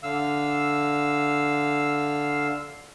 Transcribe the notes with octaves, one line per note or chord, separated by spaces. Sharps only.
D3 F5 E6